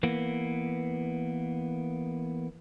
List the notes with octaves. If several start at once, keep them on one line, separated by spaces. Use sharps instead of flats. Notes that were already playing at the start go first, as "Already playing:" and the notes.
E3 A#3 B3